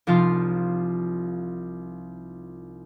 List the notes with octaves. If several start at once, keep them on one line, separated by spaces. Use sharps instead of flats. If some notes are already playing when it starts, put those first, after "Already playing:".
C2 F3 D#4 F4 C6